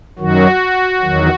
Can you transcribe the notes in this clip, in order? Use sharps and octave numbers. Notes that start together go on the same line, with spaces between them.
F#2 D#3 F#3 F#4
E2 D#3 F#3